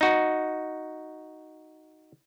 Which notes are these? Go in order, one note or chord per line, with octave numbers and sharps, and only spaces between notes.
D#4 F#4